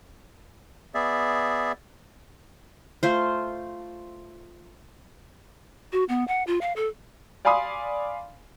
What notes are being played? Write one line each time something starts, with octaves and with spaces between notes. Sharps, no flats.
B3 G#4 D5 E5
A3 F4 C5
F#4
B3
F#5
F4
F5
A4
D5 F5 G#5 B5 C6 D#6